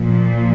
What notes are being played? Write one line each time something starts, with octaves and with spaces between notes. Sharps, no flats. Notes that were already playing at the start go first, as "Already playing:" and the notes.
Already playing: A#2 F3